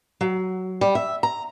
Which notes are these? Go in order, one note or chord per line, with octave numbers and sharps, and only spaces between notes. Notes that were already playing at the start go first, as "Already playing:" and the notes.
F#3
G3
E5
A#5